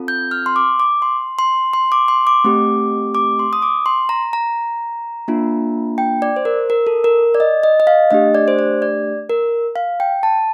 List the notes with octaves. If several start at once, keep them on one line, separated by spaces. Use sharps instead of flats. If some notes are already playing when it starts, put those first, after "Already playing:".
Already playing: C4 F4 A4
G6
F6
C6
D6
D6
C6
C6
C6
D6
C6
D6
A3 C4 G4
D6
C6
D#6
D6
C6
A#5
A#5
A#3 D4 F4
G5
D5
C5
A#4
A#4
A4
A#4
D5
D#5
D#5
D#5
F5
A3 D4 G4 D#5
D5
C5
D5
D5
A#4
F5
G5
A5